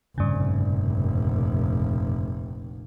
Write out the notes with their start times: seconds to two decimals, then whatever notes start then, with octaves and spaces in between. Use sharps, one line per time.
0.18 F1 A#1 G2 C#3